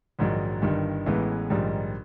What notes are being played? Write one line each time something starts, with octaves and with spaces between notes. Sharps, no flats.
A#1 G#2 D#3 F#3
G1 G2 D#3 G3
A1 A2 E3 G#3 B3
A#1 G#2 D#3 G3